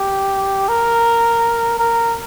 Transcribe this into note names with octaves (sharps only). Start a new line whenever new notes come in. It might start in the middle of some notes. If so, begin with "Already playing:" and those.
Already playing: G4
A#4
A#4